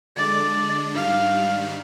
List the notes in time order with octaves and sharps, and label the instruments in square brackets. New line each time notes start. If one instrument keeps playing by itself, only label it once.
[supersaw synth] D3 G#3 D4 [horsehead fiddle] D5
[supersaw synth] G#2 D#3 G3 D4 [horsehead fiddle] F5